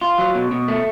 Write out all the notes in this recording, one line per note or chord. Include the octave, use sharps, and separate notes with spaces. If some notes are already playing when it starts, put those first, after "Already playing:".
F4
F#3
B2
B2
A3